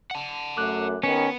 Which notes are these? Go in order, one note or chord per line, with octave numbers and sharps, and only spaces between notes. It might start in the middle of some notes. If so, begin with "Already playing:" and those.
F#5 A5
F#2 A3 D6 F#6
D#2 D#3 B3 C#4 B4 C#7